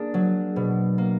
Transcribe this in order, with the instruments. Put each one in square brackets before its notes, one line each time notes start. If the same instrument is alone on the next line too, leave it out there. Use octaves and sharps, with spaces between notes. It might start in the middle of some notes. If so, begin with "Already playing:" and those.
Already playing: [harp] A#3 D4 [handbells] G#4
[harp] F#3
B2
A#3